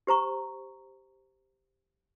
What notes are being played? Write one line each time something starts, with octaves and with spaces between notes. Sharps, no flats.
G4 C5 A#5 C#6